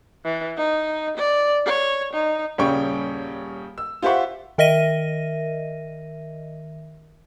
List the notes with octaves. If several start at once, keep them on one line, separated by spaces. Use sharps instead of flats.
E3
D#4
D5
C#5
D#4
D#1 C#3 G3 C#4 G5 C#6
E6
F4 G4 C5 E5 F#5 C#6
D#3 A#4 D#5 E5 A#6 D#7